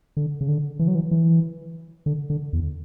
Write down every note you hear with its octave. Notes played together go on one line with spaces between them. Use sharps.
D3
C#3
D3
E3
F#3
E3
E3
D3
D3
E2